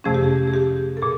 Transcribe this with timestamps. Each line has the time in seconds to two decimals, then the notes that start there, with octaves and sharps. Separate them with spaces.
0.04 F2 C3 F3 A3 C#4 G#4
0.14 G4
0.24 G#4
0.48 G#4
0.54 G4
0.97 A4
1.02 A#2 G#4